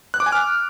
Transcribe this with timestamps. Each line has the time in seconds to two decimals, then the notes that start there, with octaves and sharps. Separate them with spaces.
0.14 F#6
0.20 D6
0.26 G#5
0.32 F6